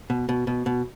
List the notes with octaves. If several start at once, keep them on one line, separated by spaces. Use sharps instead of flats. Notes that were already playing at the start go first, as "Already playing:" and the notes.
B2
B2
B2
B2